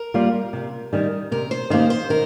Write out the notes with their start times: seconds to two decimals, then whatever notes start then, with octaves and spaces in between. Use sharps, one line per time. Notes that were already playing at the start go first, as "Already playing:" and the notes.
Already playing: A#4
0.14 G3 A#3 F4
0.53 C3
0.93 D#3 G3
1.31 C3 A#4
1.51 C5
1.70 D#3 A#3 G4 C5
1.90 C5
2.10 D#3 A#4